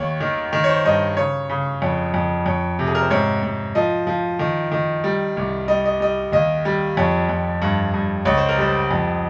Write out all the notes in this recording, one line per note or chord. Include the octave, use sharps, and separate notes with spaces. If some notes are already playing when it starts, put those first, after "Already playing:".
Already playing: D#2 C#5
D#3
D#3
C#5
C5
G2 D#5
C#3 C#5
C#3
F2 C#5
F2
F2 C#5
C3
G#4
A#4
C5
G#2 C#5
G#2
F3 D#5
F3
D#3
D#3
G3
C2
G3 D#5
D#5
G3 D#5
D#2 D#5
G3
F2 C#5
F2
G2
G2
C#2 C#5
C5
A#4
G3 C5
F2